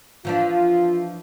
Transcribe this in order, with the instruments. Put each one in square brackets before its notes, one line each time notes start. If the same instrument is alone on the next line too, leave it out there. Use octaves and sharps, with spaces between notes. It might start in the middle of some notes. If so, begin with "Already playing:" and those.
[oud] E3 F3 D4 [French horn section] F4